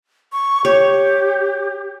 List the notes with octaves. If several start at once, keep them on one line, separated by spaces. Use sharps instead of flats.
C#6
G4 C#5